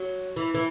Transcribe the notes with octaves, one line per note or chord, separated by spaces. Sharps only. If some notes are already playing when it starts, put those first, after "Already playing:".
Already playing: F#3
E3
E3